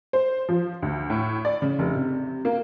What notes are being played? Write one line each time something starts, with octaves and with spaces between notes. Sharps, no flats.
C5
F3
D2
A2
D5
C#3
F1
C3
A#3